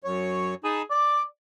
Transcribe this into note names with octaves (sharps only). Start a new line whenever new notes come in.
F#2 C#5
D#4 G#4 A5 B5
D5 D6